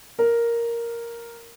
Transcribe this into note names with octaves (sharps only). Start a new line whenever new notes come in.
A#4